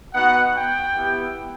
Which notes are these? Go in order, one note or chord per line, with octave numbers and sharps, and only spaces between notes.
B3 D#4 F#4 F#5
G5
B3 E4 G4